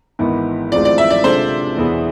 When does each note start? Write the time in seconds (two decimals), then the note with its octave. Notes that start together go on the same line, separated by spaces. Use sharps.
0.19 G#1 G#2 E3 B3 E4
0.72 A1 A2 G#3 C4 F4 D5
0.85 D5
0.98 E5
1.10 D5
1.24 C3 G#3 D4 F4 A4 C5
1.77 E2 B2 B3 E4 G#4